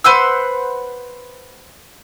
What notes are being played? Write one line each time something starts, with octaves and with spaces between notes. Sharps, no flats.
B4 C5 F#5 E6